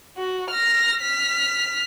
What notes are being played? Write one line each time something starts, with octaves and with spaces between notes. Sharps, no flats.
F#4
F6 A#6
F6 B6